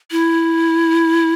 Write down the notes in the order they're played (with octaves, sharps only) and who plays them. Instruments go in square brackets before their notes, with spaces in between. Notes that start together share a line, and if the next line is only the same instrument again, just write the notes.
[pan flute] E4